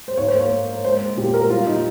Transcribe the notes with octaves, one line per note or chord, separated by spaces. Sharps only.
C5
G#2 C#5
C5
A#3
C#5
A#3
A#3
G#3 C5
G#3
A#2 G4
G#3 A#4
G3 F4
A#2 D#4